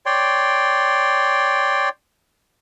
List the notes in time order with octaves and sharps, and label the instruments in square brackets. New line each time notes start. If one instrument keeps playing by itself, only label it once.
[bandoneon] C#5 D5 G5 C6